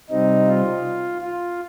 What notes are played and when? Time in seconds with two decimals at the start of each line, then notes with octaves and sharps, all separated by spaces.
0.10 C3 G3 C4 D#4
0.47 F4
1.21 F4